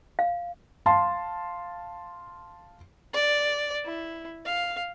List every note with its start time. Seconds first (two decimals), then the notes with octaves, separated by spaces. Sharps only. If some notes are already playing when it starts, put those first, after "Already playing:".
0.19 F5
0.86 F5 A5 C6
3.14 D5
3.86 E4
4.45 F5